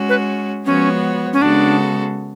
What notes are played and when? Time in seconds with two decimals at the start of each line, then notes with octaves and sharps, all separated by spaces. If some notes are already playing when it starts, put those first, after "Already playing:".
Already playing: G#3 C#4 F#4
0.09 B4
0.65 F3 G#3 B3 C#4 F#4 C#5
1.33 C#4
1.41 C#3 G#3 B3 D4 F#4 A4